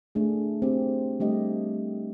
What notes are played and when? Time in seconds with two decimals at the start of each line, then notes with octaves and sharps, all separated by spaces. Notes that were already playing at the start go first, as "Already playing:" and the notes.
0.15 A3 D4 G#4
0.62 C4 G4
1.20 G3 A3 D4 G4 D#5